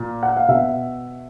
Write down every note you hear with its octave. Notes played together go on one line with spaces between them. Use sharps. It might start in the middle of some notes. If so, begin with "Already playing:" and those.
Already playing: A#2
F#5
F5
B2 E5